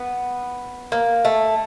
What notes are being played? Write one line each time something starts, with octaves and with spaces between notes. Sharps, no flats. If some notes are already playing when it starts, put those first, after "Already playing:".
Already playing: B3
A#3
A3